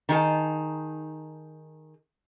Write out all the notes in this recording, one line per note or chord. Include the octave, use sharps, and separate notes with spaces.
D#3 D#4 G#4 A5